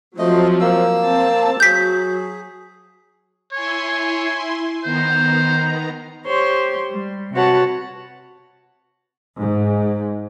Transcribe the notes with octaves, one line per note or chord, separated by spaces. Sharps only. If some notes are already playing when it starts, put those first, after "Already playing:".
F3 F#3 A3 C4 D#5
A#3 E6
C4 A5
F#3 G#4 G6 B6
E4 C#5 G#5 C6
D#3 B3 C5 A#5
G4 C5 C#5 C6
G3
C3 F#4 B4 C#5 F#5 A5
G#2